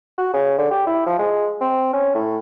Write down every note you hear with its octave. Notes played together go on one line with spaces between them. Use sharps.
F#4
C#3
D3
G4
E4
F3
G#3
C4
C#4
A2